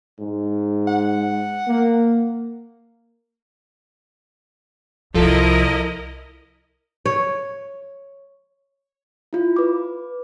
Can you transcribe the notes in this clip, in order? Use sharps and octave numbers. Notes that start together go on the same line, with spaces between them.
G#2
F#5
A#3
C2 F3 E4 F4 A4 A#4 D#5
C#5
E4 F4
B4 D6